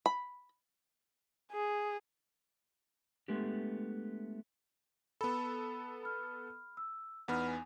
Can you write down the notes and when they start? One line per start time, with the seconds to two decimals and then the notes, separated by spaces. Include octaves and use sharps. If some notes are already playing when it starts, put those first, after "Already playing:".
0.06 B5
1.52 G#4
3.28 G#3 A3 B3 D4 G4
5.21 B3 A4 B5
6.03 B5 F6
6.77 E6
7.28 E2 B3 D#4 F#5 B5 F6
7.47 G#5